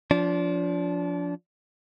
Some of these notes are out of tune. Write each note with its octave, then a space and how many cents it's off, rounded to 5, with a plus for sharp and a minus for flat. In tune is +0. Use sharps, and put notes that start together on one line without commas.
F3 +10 D4 -30